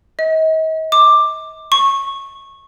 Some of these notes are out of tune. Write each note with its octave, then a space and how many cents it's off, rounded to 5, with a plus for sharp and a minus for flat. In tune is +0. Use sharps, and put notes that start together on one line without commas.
D#5 +40
D6 +10
C#6 -15